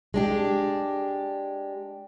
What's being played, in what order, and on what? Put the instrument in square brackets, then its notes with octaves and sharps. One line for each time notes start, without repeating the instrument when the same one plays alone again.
[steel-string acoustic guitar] G#3 D4 G4